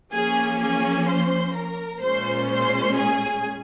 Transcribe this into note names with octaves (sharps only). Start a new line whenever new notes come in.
F3 A#3 C#4 G#4 G#5
G#4 G#5
C5 C6
A#4 A#5
A#2 G#3 C#4 C5 C6
C5 C6
G#4 G#5